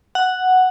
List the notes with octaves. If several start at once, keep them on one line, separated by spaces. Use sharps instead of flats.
F#5